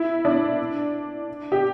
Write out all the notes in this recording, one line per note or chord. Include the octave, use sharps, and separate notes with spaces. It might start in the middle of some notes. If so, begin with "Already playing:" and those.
Already playing: E4
D4
G4